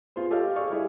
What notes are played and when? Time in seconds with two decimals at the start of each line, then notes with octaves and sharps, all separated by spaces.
0.16 B3 F4 G#4 C5
0.30 G4 A4 C#5 D#5 F5
0.56 G#4 D5 F5 C#6
0.70 G3 E4 G#4 D#5